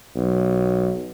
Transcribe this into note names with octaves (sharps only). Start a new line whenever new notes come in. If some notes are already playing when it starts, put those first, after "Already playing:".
B1